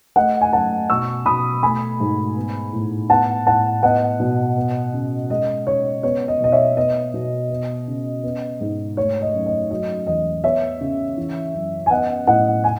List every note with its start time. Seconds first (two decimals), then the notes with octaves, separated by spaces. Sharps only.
0.16 A3 D#5 F#5
0.41 G#5
0.53 F#2 F#5 A5
0.89 B2 C#6 E6
1.26 B2 B5 D#6
1.63 A3 G#5 B5
2.00 G#2
2.36 B3
2.73 A2
3.10 B3 F#5 A5
3.47 A2 F#5 A5
3.83 B3 D#5 F#5
4.20 B2
4.57 B3
4.93 C#3
5.30 G#3 D#5
5.67 C#3 C#5
6.03 B3 C#5
6.28 D#5
6.40 B2 D#5
6.52 C#5 E5
6.77 B3 D#5
7.14 B2
7.50 B3
7.87 C#3
8.24 B3
8.61 G#2
8.97 A3 C#5
9.22 D#5
9.34 F#2
9.46 D#5
9.71 F#3 D#5
10.07 E2 D#5
10.44 B3 C#5 E5
10.81 C#3
11.17 E3
11.54 F#2
11.86 G#5
11.91 B3 D#5 F#5
12.27 A2 D#5 F#5
12.64 G#5